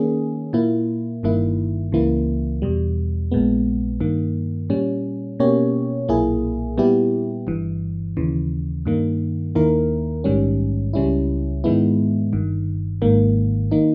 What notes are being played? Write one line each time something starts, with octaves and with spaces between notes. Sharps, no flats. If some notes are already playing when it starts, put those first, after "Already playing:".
Already playing: D#3 A#3 C#4 G#4
A#2 A#3 E4
G1 G2 D#3 A#3 E4
C#2 C#3 E3 A#3 E4
E2 B2 G3
A#1 A#2 G#3 B3
G2 D#3 A#3
A#2 G3 C#4
B2 A#3 C#4 G4 C#5
B1 A#2 A#3 E4 G#4
A#2 G3 B3 E4 G4
G1 G2 E3
D#2 C#3 E3
G2 D#3 A#3
D#2 D#3 A#3 E4 A#4
A#1 G#2 D#3 G3 C#4
C#2 C#3 G3 C#4 E4
G#2 D#3 G#3 B3 E4
G1 G2 D#3
G#1 G#2 D#3 A#3
D#3 A#3 D#4